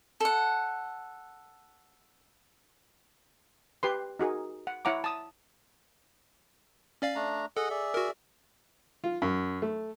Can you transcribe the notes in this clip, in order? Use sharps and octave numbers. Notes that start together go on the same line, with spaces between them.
A4 F#5
G4 B4 C6
D#4 F#4 G#4 A#4
F#5
E4 C#5 F#5 A#5 D6
A5 D#6
C#4 D5 F5
A3 D4 A#5
G#4 A4 D#5 F#5
G#4 D5 E5
F#4 A#4
F4
F#2
A3